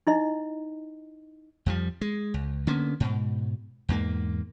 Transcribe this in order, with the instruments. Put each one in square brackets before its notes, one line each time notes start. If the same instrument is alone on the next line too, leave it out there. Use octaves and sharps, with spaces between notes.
[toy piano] D#4 E4 D#5
[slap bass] F2 F3 G3
G#3
C#2
D3 A#3 B3 C#4
G#2 B2
E2 G#2 A#3